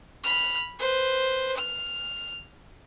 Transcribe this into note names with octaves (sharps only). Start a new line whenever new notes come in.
B5 F6
B4 C5
F6